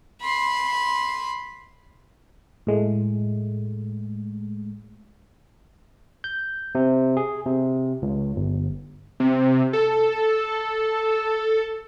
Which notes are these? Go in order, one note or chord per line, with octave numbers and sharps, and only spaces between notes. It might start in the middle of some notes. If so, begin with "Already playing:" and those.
B5 C6
A2 G#3 A3
G6
C3
G#4
C3
C#2
G1
C3
A4